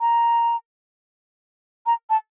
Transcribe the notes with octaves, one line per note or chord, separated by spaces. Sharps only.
A#5
A#5
A5